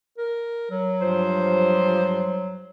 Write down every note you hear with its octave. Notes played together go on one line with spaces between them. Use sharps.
A#4
F#3
G2 F3 C5